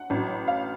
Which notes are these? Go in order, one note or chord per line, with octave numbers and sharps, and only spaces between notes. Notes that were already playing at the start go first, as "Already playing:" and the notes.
Already playing: F#5
A1 A2 F#3
F5